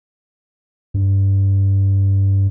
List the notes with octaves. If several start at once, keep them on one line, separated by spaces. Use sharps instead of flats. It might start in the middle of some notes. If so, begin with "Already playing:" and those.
G2